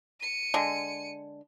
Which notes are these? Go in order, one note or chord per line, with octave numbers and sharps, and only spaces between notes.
C#7 D#7
D3 G#3